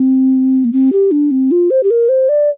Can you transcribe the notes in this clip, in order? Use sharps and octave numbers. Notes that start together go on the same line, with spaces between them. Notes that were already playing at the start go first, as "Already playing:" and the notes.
Already playing: C4
A#3
C4
G4
D4
C4
F4
C5
G4
A#4
C5
D5